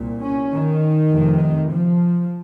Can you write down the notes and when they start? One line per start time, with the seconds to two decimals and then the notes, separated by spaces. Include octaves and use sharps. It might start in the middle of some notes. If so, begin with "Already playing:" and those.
Already playing: C2 A#2
0.21 C#4
0.52 D#3
1.12 F1 F2 C3
1.72 F3